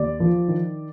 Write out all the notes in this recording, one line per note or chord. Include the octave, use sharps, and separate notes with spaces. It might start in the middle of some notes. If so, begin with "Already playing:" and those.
Already playing: D#2 D5
F3
D#3